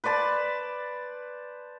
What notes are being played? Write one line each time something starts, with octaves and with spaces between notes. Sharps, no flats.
B4 C5 D5 A5